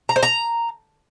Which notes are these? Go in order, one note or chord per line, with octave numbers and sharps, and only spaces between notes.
A#5
C5
A#5